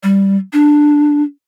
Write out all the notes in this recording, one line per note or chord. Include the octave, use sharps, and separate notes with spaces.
G3
D4